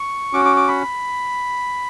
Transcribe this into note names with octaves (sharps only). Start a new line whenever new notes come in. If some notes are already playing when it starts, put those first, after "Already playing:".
Already playing: C#6
C#4 F#4 D6
D6
D6
B5